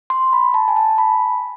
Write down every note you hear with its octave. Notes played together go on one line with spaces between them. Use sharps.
C6
B5
A5
G#5
A5
B5